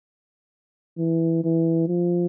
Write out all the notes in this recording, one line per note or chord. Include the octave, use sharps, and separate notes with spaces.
E3
E3
F3